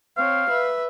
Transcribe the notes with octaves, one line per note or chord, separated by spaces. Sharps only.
C4 C#5 F5
B4 E5